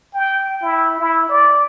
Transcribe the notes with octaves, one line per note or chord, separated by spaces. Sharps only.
G5
E4
E4
D5